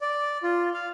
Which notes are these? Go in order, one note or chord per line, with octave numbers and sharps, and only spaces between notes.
D5
F4
F5